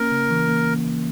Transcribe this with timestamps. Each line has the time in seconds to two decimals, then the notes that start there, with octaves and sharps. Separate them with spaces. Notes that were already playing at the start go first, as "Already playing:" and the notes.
Already playing: A#3 C#4 A#4
0.11 C#3
0.31 E3
0.49 A#3